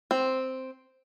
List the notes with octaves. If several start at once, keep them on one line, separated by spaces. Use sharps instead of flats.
C4